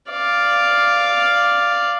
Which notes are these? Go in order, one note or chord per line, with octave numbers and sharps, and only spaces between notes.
D5 F5